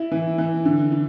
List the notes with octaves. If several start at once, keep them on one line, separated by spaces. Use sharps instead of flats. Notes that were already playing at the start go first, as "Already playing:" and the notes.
Already playing: E4
E3
E3
D3
D3